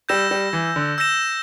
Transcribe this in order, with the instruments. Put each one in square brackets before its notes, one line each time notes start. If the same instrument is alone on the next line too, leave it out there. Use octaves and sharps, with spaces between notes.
[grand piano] G3 [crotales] E6 G6 A#6 E7
[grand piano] G3
E3
D3
[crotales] E6 G6 A#6 E7